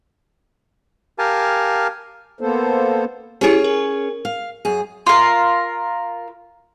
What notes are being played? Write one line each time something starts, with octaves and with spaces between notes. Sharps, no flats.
G4 A#4 F5 G#5 A5
A#3 B3 A4 C5
C#4 E4 G4 G#4 C#5
A#4
F5
F#2 G#4
F4 A#4